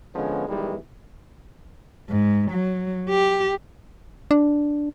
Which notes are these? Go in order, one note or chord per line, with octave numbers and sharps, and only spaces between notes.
D3 F3 G#3 B3 C#4
B1 D#3 E3 G3 G#3
G#2
F#3
G4
D4